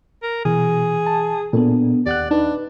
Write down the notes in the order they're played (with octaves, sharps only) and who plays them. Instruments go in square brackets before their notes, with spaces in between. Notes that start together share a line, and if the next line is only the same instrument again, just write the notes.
[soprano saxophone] A#4
[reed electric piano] B2 [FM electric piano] E3 [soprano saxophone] G#4
[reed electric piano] A5
[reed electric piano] A#2 [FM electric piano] B3 D4 A4
[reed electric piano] D#2 [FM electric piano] G4 F#5 F#6 [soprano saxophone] D5
[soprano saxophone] D4 [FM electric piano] D#4 B4